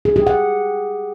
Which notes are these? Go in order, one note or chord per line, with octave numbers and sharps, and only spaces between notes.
G#4
G4
F#5